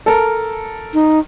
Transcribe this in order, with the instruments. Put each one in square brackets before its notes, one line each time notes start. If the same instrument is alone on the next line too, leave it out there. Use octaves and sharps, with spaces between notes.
[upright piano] A4 A#4
[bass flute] D#4